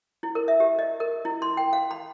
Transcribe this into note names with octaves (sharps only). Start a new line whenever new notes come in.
E4
A#4
E5
G4
D#5
A#4
E4
C6
G5
F5
B5